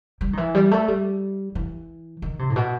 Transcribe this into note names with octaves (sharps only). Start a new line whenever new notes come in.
G3
D#3
E3
G3
A3
G3
E3
D#3
C3
A2
B2